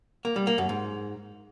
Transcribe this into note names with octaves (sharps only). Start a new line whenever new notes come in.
A#3
G3
A#3
F#2
G#2